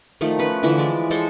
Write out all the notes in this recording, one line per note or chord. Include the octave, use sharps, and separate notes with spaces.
D#3 F3 A3
C#4 B4
D3 E3 F3 E5
G#3 D5
G#3 A4 C5 C#5